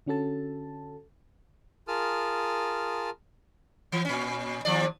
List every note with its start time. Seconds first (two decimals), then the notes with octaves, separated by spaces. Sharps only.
0.06 D3 C#4 F#4 A4 A5
1.88 F4 G#4 A#4 A5 D#6 F6
3.92 E3
4.05 A#2 C#4
4.65 D#2 F3 D5